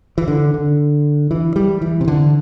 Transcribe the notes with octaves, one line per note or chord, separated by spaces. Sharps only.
E3
D3
D3
E3
G3
E3
C3
D3